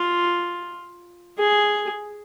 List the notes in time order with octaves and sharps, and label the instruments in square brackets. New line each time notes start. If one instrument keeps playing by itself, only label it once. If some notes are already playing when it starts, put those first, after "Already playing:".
Already playing: [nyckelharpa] F4
G#4